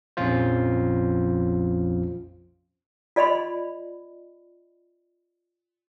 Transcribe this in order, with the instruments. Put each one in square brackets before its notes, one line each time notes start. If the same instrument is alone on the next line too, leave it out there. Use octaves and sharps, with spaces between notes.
[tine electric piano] A#1 F2 C#4 F4 C5
[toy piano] F4 D5 D#5 B5 C6